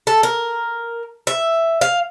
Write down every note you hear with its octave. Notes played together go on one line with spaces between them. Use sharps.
A4
A#4
E5
F5